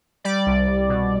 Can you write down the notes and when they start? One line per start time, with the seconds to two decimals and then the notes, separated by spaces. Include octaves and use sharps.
0.24 G3 D5
0.46 C2
0.67 C2
0.89 B2